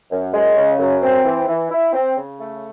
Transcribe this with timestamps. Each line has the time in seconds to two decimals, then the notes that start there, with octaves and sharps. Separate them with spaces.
0.11 F#2
0.34 G#3
0.56 C#3
0.79 F#2
1.02 C4
1.25 E3
1.47 E3
1.70 E4
1.93 C4
2.16 C#3
2.39 A3